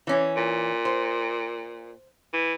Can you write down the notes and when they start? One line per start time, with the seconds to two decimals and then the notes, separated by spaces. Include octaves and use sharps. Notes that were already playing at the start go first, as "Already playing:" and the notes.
0.07 E3 C#4
0.36 A#2
0.85 C5
2.33 E3